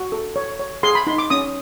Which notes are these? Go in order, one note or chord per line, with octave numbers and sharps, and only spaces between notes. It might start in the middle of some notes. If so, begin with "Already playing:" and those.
Already playing: F#4
A4
C#5
C#5
G#4 C6
B5
D#4 C6
D6
C#4 D#6